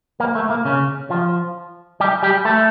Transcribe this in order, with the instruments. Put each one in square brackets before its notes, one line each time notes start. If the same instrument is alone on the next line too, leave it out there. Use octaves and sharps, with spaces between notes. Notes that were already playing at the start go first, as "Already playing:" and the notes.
[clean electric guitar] A#3
A3
A#3
C#3 C#4
F3 F4
G3 G4
G3 G4
A3 A4